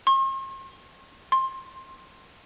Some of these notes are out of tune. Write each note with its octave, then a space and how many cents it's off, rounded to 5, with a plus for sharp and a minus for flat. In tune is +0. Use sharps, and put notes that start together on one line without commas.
C6 +45
C6 +20